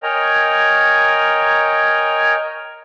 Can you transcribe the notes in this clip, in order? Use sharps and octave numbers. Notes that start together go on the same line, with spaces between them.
A#4 C#5 D#5 G5 G#5 A#5